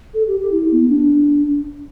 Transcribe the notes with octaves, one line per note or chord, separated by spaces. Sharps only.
A4
G4
G4
E4
B3
D4